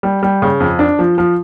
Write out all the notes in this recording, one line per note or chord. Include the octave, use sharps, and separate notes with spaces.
G3
G3
C#3
F2
D4
F3
F3